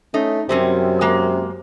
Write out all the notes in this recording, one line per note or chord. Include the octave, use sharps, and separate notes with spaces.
A3 C#4 D#4
F#2 C3 G3 C4 C#4
G#3 A#3